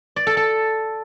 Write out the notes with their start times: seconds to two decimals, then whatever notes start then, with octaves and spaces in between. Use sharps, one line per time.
0.16 D5
0.27 A4
0.37 A4